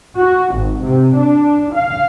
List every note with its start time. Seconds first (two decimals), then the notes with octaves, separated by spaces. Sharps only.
0.16 F#4
0.55 G#1
0.85 C3
1.18 D4
1.74 F5